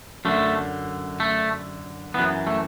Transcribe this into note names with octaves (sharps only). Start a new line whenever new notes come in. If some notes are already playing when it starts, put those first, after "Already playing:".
F#2 D3 A3
A3
F#2 E3 B3
A3